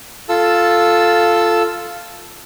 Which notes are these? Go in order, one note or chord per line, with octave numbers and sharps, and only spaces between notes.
F4 A4 A5 E6